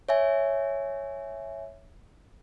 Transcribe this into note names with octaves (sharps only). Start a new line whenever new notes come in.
C#5 E5 G#5